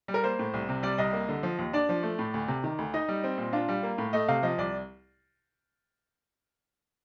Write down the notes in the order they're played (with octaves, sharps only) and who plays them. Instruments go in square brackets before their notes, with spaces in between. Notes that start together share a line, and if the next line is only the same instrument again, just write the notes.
[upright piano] G3
A#4
A#3 C5
A2
C2
C3
G3 D5
C2 D#5
A#3
D3
F3
D#2
D4 D5
F3
A3
A2
D2
C3
D#3
D2
D#4 D#5
G3
C4
A#2
D4 F4
G3
A#3
A2
A3 D#5
C3 F5
F3 D#5
C2 D5